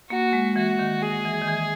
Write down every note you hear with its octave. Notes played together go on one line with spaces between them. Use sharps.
A#3 F#4
G#3
E3 F#4
D#3
G#4
E3
D#3
E3